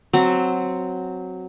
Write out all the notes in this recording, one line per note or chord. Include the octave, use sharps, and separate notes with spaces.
F#3 C4